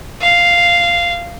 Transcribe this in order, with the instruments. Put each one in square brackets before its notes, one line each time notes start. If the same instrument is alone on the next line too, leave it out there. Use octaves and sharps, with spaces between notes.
[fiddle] F5